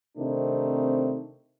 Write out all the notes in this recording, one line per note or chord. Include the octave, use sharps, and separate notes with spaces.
C3 D#3 A3 C4 D4 D#4